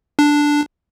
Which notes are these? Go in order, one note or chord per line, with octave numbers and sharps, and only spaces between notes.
D4